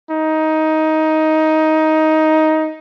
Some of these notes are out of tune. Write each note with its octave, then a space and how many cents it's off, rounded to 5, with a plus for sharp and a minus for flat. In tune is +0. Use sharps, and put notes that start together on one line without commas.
D#4 +15